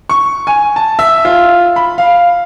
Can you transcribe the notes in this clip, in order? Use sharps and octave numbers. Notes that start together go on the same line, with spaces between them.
C#6
G#5
A5
E5
F4
B5
F5